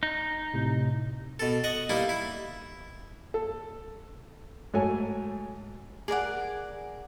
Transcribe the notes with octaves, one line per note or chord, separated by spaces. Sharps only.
D#4
A2 C3
B2 A4
D#5 F#5 C#6
G3 A#3 D#4 E4
E4
A4
G#2 F#3 A3 A4 C#5 G#5
G#4 A#4 D5 F#5